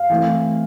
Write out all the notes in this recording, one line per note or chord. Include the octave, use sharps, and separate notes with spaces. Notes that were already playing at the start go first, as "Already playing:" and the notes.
Already playing: F5
E3 A3 C4